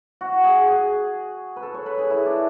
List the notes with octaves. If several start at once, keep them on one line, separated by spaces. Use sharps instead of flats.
F#4
G#4
G#4
B4
A4
C#5
B4
G#4
E4
D4